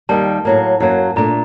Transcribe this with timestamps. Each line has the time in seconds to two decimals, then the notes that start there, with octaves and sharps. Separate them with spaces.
0.09 D#2 D#3 G3 A#3 A5
0.45 A2 F#3 A#3
0.80 F#2 F#3 A#3
1.16 A#2 A3 D4 A#5